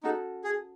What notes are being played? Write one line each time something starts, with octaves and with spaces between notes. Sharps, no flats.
C#4 D#4 F#4 A4
G#4